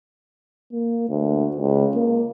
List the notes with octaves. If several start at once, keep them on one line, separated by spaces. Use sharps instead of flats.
A#3
D2
C#2
A#3